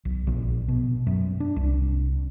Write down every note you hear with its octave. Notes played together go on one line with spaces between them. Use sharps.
B1
A#1
B2
F#2
D4
C2